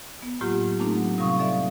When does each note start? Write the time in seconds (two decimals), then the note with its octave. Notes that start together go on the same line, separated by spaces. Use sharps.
0.22 B3
0.41 A2 F#3 A#3 F4 G4
0.79 A3 A#3 C4 D4 D#4 A4
0.96 F#3
1.18 C3 G3 C4 F5 C#6 D#6
1.39 A4 D5 E5 F5